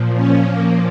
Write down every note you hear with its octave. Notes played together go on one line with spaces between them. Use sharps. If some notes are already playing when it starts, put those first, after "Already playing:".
Already playing: A#2 F3
C#4
A#3